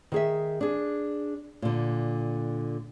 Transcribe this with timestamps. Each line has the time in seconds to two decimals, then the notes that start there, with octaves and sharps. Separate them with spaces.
0.12 D#3 G#4 E5
0.61 D4 G#4
1.62 A#2 D3